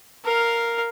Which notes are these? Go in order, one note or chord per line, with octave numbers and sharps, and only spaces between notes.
A#4 F5